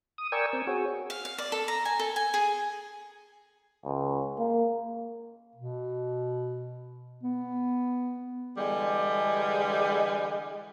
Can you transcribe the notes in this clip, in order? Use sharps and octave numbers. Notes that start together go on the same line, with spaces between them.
D#6
A#4 D5 G5 G#5 C#6 E6
C4
F#4 G#4 C#5
F5
F5
D5
A4
A#5
G#5
A4
G#5
G#4
C#2
A#3
B2
B3
D3 E3 G3 G#3